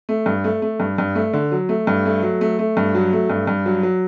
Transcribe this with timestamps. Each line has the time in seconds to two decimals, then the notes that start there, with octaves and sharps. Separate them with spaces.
0.09 A3
0.26 G2
0.44 A3
0.62 A3
0.80 G2
0.98 G2
1.15 A3
1.33 D3
1.52 F#3
1.69 A3
1.87 G2
2.06 A3
2.23 F#3
2.41 A3
2.59 A3
2.77 G2
2.95 F#3
3.13 A3
3.30 G2
3.47 G2
3.66 F#3
3.83 F#3